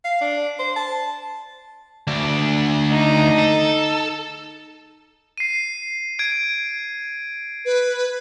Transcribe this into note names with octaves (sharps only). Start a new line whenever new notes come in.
F5
D4
C5
A5
D2 D4
D#4
A4
C7 D#7
G#6 D7
B4